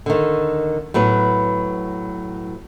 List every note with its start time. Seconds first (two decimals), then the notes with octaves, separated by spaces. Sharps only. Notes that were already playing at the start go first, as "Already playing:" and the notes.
0.06 D3 D#3
0.94 A2 F#3 B3 B4